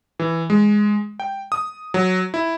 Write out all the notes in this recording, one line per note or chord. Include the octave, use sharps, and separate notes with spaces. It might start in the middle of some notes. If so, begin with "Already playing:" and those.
E3
G#3
G5
D#6
F#3
E4